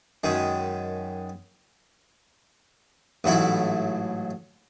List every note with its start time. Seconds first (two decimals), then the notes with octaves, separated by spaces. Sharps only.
0.24 F#2 D#3 G#3
3.24 A1 G#2 F#3 A3 E4